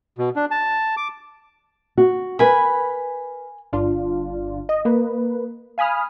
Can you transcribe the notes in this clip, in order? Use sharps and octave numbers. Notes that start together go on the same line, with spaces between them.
B2
D4
A5
D6
F#4
A#4 B4 G#5 B5
G1 D4 F4
D#5
A#3 B4
F5 G#5 B5 D#6 F6